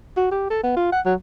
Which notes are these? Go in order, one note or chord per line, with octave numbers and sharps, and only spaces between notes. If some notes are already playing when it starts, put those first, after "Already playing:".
F#4
G4
A4
B3
F4
F#5
F#3